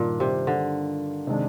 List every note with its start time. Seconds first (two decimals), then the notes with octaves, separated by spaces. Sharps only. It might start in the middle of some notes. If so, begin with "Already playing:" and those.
Already playing: G2 A#2 D#3 A#3 D4 F4
0.20 C3
0.47 D3
1.27 C3 D#3 G#3 D4